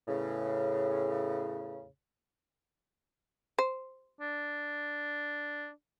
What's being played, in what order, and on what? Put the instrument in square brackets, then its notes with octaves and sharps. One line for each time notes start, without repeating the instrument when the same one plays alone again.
[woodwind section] E2 A2 C#3
[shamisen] C5
[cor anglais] D4